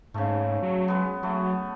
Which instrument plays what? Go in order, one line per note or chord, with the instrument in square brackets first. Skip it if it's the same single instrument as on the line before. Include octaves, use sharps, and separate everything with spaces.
[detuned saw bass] G#2 [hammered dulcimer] C#3 A3
[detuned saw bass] F#3
[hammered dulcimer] G#3 B3
[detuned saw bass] F#3 [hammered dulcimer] A3